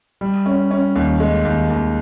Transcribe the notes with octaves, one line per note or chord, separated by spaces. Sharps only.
G3
C#4
C#4
D#2
G#3
D#2
D#2